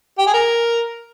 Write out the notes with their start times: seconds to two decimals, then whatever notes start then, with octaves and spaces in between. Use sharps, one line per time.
0.19 G4
0.27 G#4
0.34 A#4